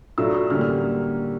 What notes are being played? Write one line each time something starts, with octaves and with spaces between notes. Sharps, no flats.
A2 F#3 A3 D4 F4 E6
E6
D3 G3 A#3 C#4 F6
F6